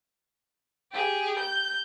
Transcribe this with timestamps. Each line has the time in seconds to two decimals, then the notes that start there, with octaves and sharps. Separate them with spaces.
0.93 G4 G#4
1.39 G6